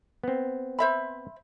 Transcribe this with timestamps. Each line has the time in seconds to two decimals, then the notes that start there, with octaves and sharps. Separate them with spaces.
0.24 B3 C4
0.79 C5 E5 B5